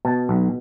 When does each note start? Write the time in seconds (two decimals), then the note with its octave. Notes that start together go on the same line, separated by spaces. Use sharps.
0.05 B2 A5
0.29 B1